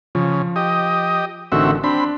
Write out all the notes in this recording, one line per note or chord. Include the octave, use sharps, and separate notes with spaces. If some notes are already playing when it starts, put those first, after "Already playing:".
C#3 F3
G4 D#5
A1 D3 D#3 C4 F#4 E5
C4 D4 B5